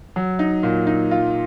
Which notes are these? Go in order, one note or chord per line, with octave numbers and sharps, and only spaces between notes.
F#3
D#4
A#2
D#4
F4